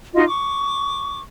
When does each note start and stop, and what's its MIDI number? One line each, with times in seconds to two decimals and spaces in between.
0.14 0.24 63
0.14 0.24 65
0.14 0.24 66
0.14 0.24 75
0.27 1.20 85
0.27 1.20 86